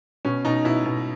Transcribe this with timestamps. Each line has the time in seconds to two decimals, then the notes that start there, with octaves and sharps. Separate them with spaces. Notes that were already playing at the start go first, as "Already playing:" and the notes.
0.25 B2 C#4
0.45 B2 D#4
0.65 B2 E4
0.86 B2